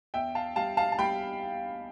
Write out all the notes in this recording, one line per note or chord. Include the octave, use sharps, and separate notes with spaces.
E2 E5 G5
F5 A5
G3 F5 A5
F5 A5
A5
G3 G5 B5